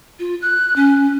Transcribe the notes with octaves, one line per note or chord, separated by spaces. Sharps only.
F4
F#6
C#4